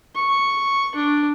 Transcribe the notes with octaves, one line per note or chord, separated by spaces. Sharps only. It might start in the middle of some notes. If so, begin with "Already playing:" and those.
C#6
D4